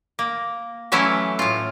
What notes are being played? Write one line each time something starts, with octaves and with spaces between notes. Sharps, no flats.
A#3
E3 F#3 A3 C#4 E4
A2 F4